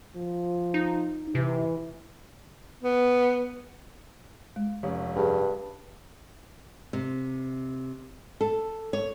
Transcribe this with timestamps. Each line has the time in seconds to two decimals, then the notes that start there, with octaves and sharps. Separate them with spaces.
0.16 F3
0.74 D#4
1.35 C3 E3
2.83 B3
4.56 G#3
4.83 F1 C#4 C#5
5.16 G2 G4 G#4
6.93 C3
8.41 A4
8.93 C#5